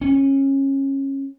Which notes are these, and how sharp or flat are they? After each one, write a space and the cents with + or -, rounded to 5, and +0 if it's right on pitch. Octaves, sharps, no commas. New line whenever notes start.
C#4 -25